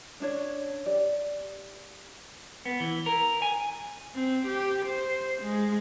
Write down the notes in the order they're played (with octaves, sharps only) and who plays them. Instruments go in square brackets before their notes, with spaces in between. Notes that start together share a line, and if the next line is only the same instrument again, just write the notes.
[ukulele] C#4 D4 C#5
G4 D5
[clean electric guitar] B3
E3
A#4
G#5
[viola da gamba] C4
G4
C5
G#3